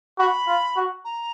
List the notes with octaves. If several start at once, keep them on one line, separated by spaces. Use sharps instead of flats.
F#4 B5
F4
F#4
A#5